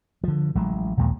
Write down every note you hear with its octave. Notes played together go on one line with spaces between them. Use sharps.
D3 F3
A1 F#3 G#3
A#1 D#2 A#2 G#3